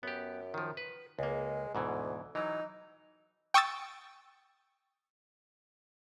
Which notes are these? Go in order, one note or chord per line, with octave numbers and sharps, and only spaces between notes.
F#2 B3 G4
D#3 F3
B4
C#2 G#3 A#3
D2 G#2 B2 E3
E3 F#3 D#4
G5 C#6 D#6 E6 A6